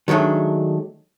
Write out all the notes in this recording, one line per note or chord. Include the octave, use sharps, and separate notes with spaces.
D#3 F#3 G#3 A3 D4